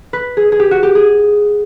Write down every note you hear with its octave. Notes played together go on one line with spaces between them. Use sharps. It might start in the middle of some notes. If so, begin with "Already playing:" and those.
B4
G#4
G#4
G4
F#4
G4
G#4